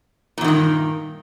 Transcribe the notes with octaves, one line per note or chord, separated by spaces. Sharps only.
E2 G2 A#2 D#3